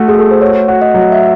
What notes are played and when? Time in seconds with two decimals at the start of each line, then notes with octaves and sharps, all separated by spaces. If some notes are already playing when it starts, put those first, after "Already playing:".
Already playing: A3 F#4
0.08 G#4
0.15 F#4 A4
0.31 C5
0.41 F#4 C#5
0.68 F#4
0.82 D#5
0.94 F#3
1.12 E5